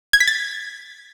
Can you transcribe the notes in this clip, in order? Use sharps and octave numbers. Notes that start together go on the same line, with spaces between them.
G#6
B6
A6